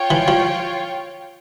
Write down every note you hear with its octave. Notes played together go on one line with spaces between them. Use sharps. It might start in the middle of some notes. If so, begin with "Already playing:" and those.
Already playing: F4 C#5 G5
E3
F3